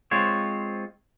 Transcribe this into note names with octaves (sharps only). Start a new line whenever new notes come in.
G#3 C4 F4 C5 C#5